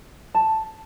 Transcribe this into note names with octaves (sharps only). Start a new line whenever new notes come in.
A5